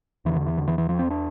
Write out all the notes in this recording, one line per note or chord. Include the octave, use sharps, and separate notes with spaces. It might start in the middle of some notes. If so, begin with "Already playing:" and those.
E2 D3 E3
D3
E3
D3
E3
E3
F3
C4
D4